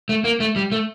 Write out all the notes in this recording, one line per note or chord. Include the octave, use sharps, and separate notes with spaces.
A3
A#3
A3
G3
A3